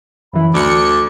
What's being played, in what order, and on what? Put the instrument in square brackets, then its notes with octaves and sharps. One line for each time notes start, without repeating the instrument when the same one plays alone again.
[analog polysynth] F#2 E3 [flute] B5
[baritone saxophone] D2 [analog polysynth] D5 C#7 [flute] D6